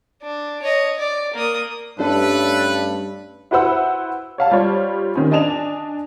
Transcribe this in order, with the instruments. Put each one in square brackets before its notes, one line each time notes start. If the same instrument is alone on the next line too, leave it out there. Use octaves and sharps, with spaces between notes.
[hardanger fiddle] D4
C#5 D#5
D5
A#3 D#6
[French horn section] G2 [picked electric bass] A3 C#4 D4 [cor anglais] A4 [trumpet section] B4
[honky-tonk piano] E4 F#4 B4 C5 F#5 E6
C#5 F5 A5
G3 F4 C5 C#5
D#3 C4 C#4
D4 D#5 G#5 A5 E7 F7